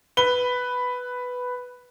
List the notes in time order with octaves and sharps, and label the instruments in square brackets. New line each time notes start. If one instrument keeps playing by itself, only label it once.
[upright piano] B4 G7